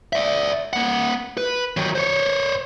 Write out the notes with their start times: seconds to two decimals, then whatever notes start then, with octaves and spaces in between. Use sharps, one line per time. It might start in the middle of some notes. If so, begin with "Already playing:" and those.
0.13 D5 E5
0.73 A#3 F#5
1.38 B4
1.77 D#3 F#3
1.95 C5 C#5